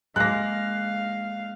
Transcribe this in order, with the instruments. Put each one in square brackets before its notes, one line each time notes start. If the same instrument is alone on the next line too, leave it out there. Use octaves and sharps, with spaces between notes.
[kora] G#3 A#3 [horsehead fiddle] F5 [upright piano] F#6 A#6